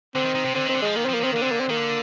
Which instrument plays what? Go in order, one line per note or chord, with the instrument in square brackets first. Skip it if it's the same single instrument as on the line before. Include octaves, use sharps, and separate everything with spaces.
[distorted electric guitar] D3 [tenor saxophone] C4
[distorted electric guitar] D#3
D#3
C3
[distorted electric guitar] D3 [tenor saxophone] C4
[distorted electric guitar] D#3 [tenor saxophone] C4
[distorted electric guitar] D3
[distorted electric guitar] F3 [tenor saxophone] G#3
[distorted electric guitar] D#3 [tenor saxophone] A#3
[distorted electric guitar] F3 [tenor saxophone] C4
[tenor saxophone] A#3
[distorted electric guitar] D#3 [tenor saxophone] C4
[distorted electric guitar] D3 [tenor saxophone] A#3
[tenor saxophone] C4
A#3
C4
[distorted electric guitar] D#3 [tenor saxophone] A#3
[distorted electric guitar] D3